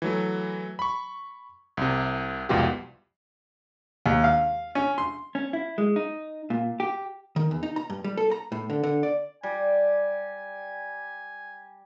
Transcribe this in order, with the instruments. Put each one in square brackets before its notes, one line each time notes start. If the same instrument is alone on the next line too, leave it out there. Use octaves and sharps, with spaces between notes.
[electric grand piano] E3 F#3 A3
B5 C#6
C2 C3
C2 F2 G#2 B2 F4 G4
[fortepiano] D#2
F5
C#4
C6
[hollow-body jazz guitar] C#4
E4
G#3
D#4
A#2
G4
D#3
E2
D#4
A#5
G2
G3
A4
A#5
A2
D3
D3
D5
[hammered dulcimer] G3 [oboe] G#5